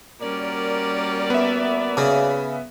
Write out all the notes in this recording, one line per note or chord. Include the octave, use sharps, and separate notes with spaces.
G3 A#3 C#4 F#4 A#4 D5
B3 E5
C#3